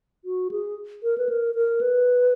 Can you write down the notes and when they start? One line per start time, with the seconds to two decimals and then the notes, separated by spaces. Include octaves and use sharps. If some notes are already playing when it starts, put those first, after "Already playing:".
0.25 F#4
0.51 G#4
1.03 A#4
1.18 B4
1.29 A#4
1.55 A#4
1.81 B4